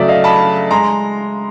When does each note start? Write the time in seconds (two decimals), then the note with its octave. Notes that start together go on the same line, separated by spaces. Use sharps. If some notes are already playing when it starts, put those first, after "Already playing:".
Already playing: C#3 F#3 A3 D5 E5
0.08 D#5 F5
0.24 A5 B5
0.70 G#3 A#5 C6